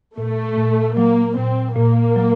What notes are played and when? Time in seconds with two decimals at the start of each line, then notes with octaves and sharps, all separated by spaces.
0.18 A#2 A3
0.57 A#2
0.97 F#3 A#3
1.37 A#2 C4
1.76 A#2 A#3
2.16 F#3